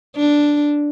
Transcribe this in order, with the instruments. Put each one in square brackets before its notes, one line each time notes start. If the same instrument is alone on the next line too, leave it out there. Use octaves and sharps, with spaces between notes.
[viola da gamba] D4